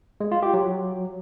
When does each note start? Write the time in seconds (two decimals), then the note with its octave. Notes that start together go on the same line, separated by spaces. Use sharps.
0.20 G#3
0.32 F4
0.43 G4
0.54 F#3